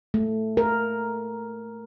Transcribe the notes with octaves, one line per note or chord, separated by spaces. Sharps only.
A3
A#4